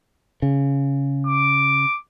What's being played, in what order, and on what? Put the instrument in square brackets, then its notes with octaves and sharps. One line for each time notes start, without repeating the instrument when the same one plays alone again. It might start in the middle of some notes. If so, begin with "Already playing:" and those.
[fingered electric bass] C#3
[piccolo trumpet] D6